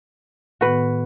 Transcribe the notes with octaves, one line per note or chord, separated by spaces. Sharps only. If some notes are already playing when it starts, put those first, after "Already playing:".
A2 D#3 B3 F#4 B4